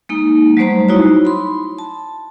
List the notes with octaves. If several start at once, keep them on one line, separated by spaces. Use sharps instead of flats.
G#3 A#3 D#4
F#3 G3 A3 C5 A#5
D#4 E4 F#4 C#5
B5 C6
A5